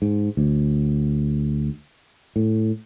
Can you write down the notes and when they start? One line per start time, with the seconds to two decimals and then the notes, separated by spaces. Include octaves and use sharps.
0.02 G#2
0.37 D2
2.36 A2